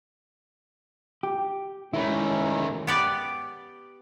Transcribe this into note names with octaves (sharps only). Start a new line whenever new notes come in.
G4
D#3 G#3 A3 C#4 E4 B4
B3 G4 D5